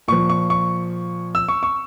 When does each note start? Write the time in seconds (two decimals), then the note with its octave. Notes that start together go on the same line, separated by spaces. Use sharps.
0.08 A#2 F3 C#6
0.30 C#6
0.50 C#6
1.35 E6
1.48 C#6
1.63 C#6